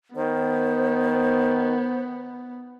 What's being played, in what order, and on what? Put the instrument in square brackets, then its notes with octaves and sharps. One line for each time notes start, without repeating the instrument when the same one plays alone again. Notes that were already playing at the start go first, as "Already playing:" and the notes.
[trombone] D#3 [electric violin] B3 [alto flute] C5